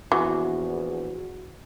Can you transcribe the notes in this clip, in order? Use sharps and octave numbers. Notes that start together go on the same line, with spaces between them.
A#1 E2 E3 F#4